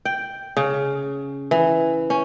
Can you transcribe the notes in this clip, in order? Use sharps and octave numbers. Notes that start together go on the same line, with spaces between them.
G5
C#3
E3
C#4